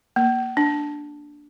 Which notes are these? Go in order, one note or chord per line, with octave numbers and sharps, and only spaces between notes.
A#3
D4